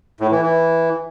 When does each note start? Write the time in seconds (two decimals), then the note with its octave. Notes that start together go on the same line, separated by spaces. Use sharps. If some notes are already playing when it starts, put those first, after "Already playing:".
0.20 A2
0.31 E3
0.42 E3